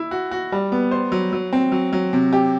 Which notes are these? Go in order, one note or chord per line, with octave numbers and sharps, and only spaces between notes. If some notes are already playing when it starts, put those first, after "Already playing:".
Already playing: E4
F#4
F#4
G3
B3
C5
F#3
F#3
C4
F#3
F#3
C3
G4